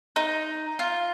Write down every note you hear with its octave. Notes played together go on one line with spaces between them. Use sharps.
D#4
F4